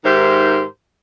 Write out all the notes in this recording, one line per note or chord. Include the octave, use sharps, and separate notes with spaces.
G#2 D#3 G4 A#4 C5 E5